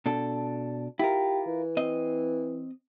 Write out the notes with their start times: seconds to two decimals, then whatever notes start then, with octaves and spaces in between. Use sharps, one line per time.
0.06 B2 D4 A4
0.99 E4 F4 G4 A#4
1.47 E3
1.77 C4 D#5